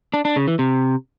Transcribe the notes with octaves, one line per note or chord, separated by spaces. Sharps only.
D4
D4
C#3
E3
C3